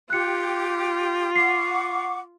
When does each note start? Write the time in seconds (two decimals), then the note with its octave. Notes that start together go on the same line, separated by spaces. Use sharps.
0.10 F4 G4 F#6 C#7
1.36 F#5 C#6 D6 C7